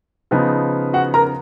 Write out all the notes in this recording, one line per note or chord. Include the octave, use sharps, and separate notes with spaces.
C#3 F3 B3 D#4
F#4 F#5
A#4 A#5